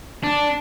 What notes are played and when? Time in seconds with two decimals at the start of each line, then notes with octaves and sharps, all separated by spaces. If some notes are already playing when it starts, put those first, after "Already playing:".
0.24 D4